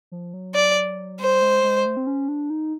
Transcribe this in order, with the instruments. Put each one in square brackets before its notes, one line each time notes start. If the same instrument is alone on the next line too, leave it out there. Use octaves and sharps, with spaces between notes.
[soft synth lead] F3
F#3
[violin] D5
[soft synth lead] G3 [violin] C5
[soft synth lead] G#3
G#3
A3
C4
C#4
D4
D#4